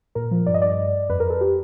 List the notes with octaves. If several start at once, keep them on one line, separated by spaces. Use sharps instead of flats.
A#2 A#4
F3
G2 D5
D#5
G2 D5
G2
G2
F2 B4
A#4
F2 A4
G4